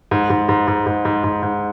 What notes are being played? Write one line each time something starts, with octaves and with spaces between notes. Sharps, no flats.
G#2
G#2
G#2
G#2
G#2
G#2
G#2
G#2